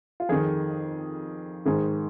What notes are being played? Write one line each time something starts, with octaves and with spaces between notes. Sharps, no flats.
F4
F2 D#3 G#4
G#2 D#3 G#4